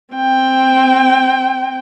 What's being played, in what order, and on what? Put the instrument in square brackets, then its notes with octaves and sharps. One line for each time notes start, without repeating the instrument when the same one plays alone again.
[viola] C4 G5